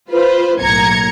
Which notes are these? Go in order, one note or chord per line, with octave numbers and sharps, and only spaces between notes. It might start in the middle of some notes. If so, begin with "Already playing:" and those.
F4 B4 C5
B1 A2 A#3 A#5 G#6 C#7